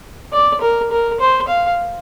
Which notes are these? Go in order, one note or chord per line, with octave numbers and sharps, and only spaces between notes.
D5
A#4
A#4
C5
F5